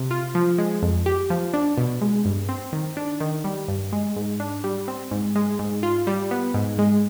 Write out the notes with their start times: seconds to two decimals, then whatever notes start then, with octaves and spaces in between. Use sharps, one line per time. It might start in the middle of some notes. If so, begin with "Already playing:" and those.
Already playing: C3
0.11 F4
0.35 F3
0.58 G#3
0.83 F2
1.06 G4
1.30 F3
1.54 D4
1.78 B2
2.02 G#3
2.25 G2
2.49 C4
2.73 D#3
2.97 D4
3.21 D#3
3.44 G3
3.68 G2
3.92 G#3
4.16 G#2
4.40 D4
4.64 G3
4.88 C4
5.11 G#2
5.35 G#3
5.59 G#2
5.83 F4
6.07 G3
6.31 B3
6.54 G#2
6.79 G#3